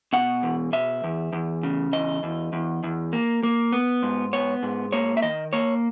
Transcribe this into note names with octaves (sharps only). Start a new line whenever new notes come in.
B2 F#5
E2
B2 E5
E2
E2
C#3
E2 D#5
E2
E2
E2
A#3
A#3
B3
G#2
B3 C#5
G#2
A#3 C#5
E5
D#3 D#5
A#3 C#5